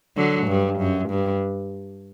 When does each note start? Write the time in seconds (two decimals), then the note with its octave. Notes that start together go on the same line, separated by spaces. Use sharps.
0.17 D3 F#3
0.47 G2
0.79 F#2
1.09 G2